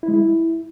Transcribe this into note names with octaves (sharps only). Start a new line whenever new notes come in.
E4
G#3
E4